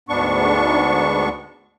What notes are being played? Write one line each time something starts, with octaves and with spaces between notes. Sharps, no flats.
D2 G#2 B3 D4 C#6